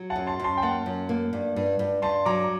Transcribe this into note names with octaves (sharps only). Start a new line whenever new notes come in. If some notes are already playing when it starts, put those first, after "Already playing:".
Already playing: F#3
F#5 A5
F#2
A5 C6
F#2 A5 C6
G5
A#3 F#5 A5
F#2
A#3
G2
G2
G2
G2 A5 C6
F#3 A#5 D6